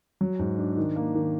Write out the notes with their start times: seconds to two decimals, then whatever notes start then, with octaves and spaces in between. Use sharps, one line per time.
0.21 F#3
0.39 G#2
0.58 D4
0.77 D#3
0.96 A#3
1.15 D#3